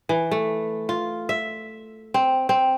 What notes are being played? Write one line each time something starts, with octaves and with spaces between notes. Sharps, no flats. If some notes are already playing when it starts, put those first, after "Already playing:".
E3
A3
F4
E5
C4
C4